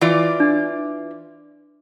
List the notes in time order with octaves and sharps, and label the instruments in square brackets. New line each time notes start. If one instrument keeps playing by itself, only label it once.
[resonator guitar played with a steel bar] E3 F4 D5
[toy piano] D4